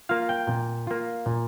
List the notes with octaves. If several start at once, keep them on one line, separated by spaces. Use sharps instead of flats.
A#3 F4 F5
G5
A#2
A#3 F4
A#2